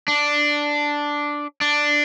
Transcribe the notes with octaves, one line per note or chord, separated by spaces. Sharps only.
D4
D4